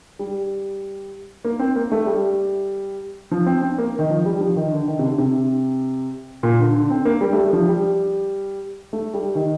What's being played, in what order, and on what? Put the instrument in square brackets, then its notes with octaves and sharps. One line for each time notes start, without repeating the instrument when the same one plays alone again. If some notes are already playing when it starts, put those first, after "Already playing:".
[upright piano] G3
A#3
C4
A#3
A3
G3
F3
C4
C4
A#3
D#3
F3
G3
F3
D#3
D3
D#3
C3
D3
C3
A#2
D3
D3
C4
A#3
G3
A3
G3
F3
G3
A3
G3
D#3